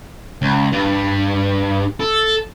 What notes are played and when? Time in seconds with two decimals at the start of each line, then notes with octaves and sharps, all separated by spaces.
0.42 C#2
0.72 G2
2.01 A4